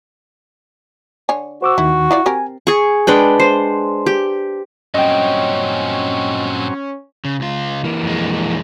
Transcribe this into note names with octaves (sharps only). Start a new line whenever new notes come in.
D3 C#5 G#5
F#4 C5 D6 E6
D#2 D#3 E4
F#3 E4 F4 D5
C4 G4 A#4 G#5
G#4 C#6
G#3 D4 B4 G5
C5
G4
G2 A#2 F#3 C4 C#4 C#5 D#5 G5
C#3
C#2 F4
E3 A#3
F2 G#3